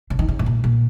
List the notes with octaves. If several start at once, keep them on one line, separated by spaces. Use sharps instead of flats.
C#3
D#3
C#3
G#2
A#2
A#2